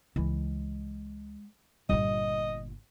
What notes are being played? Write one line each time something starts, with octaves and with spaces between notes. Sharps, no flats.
C#2 E3 G#3
G1 A#2 G3 D#5